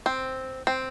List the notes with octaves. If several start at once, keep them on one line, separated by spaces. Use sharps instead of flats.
C4
C4